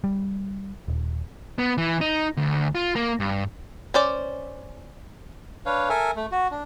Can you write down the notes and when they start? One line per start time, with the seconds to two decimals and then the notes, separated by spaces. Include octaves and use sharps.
0.04 G3
0.88 D#1
1.59 B3
1.78 E3
2.01 D#4
2.37 D2
2.75 F4
2.96 A#3
3.20 G2
3.94 C#4 C5 D5
5.66 D4 B4 C#5 F5
5.89 A4 A#4 E5 G#5
6.16 A3
6.32 F#4
6.51 D4